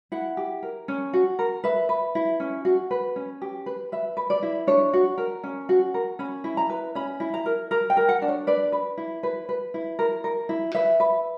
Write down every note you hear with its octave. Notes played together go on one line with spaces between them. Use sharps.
E4 F#5
G4
A#4
C#4
F#4
A#4
B4 E5
B4
E4
C#4
F#4
B4
C#4
G4
B4
B4 E5
B4
D5
E4
D4 C#5
F#4
A#4
C#4
F#4
A#4
C#4 B5
E4
A#5
B4
C#4 B5
E4
A#5
A#4
A#4 A#5
G5
A#4
F#5
D4
C#5
B4 D5
B4
E4
B4
B4
E4
A#4
A#4
E4
B4 E5
B4